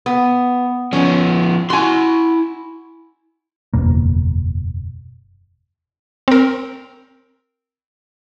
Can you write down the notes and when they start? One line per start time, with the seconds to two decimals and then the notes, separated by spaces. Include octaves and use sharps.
0.06 B3
0.93 F3 B3 C#4
1.70 E4 F#4 G#5 C6
3.73 F#1 E2 B2 A#3
6.28 C4 A#4